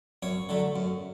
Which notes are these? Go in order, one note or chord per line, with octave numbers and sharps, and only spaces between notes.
F#2 C#5
D3 F#3 A3
F#2